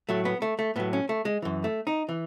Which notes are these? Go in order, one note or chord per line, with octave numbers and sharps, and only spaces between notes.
A2 F#3 A3
B3
A3
A3
A2 F#3 B3
C#4
A3
G#3
F#2 E3
A3
D#4
E3